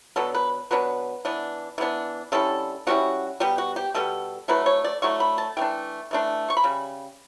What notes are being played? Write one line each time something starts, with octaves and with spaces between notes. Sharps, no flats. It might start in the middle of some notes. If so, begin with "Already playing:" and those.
B2 F#3 B3 D4 A4
B4
B2 F#3 B3 D4 B4
E3 B3 D4
E3 B3 D4
D3 G3 C#4 E4 A4
D3 G3 C#4 E4 F#4
B2 G3 B3 G4
F#4
G4
B2 G3 B3 A4
D3 F#3 A3 E4 B4
C#5
D5
D3 F#3 A3 E4 C#6
B5
A5
E3 A3 D4 G5
E3 A3 D4
C#6
B5
C#3 G3